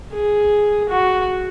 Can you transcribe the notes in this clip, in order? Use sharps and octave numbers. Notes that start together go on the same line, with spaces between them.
G#4
F#4